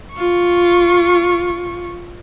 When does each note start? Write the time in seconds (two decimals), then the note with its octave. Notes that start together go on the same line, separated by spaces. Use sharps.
0.14 F4 C#6